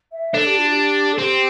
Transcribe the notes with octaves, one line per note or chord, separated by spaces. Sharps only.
E5
D4 A4
G4
F4
G4
A4
C4 G4